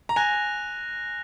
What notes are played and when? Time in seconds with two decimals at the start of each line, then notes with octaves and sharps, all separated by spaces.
0.09 A#5
0.16 G#5 F#6 A#6 F7